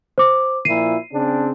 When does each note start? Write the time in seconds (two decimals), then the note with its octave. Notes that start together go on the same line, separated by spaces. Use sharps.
0.18 C5 D6
0.65 A#2 F3 E4 C7 D#7
1.12 C#3 C4 D4